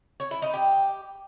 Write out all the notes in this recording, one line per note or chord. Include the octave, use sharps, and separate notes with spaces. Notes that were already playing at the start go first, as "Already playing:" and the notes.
C#5
E4
D#4
G4